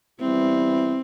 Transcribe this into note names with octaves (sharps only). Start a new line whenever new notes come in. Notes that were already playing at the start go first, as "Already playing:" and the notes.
E3 G3 B3 C4 E4